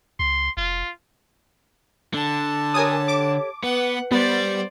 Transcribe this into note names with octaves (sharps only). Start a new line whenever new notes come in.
C#2 C6
F1 F4
D3 A5
G4 A4 A#4 C#5 G#5 D#6
D6
B3 B4 F#5
G3 B3 C5 D5